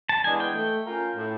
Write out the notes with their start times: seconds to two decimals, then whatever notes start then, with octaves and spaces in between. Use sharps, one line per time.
0.09 A5
0.24 E3 G#3 B3 D4 G#5
0.40 G5
0.55 A3
0.85 C#4 F4 A#4
1.16 A2